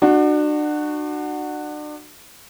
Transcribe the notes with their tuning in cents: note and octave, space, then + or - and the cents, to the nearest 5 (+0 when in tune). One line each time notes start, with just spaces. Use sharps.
D4 +35 F#4 +0